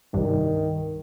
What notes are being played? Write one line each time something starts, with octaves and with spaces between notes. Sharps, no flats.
C2 G2 D#3